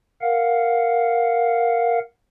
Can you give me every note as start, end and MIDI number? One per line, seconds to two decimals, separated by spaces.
0.21 1.99 70
0.21 1.99 77
0.21 1.99 78